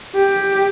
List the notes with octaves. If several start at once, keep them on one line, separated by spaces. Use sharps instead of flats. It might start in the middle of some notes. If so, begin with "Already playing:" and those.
G4